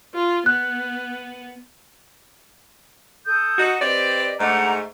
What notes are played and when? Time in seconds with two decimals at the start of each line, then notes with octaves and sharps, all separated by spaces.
0.14 F4
0.46 B3 F#6
3.25 A4 D#6 G6
3.57 D#4 F#4
3.80 C4 G4 B4 D5 D#5
4.38 G#2 A3 D4 F#5 A#5